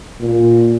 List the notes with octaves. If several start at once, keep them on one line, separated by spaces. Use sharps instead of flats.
A#2